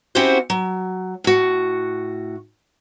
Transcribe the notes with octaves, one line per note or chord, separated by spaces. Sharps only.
C4 C#4 E4 F#4 G4 C5
F#3
A2 F#4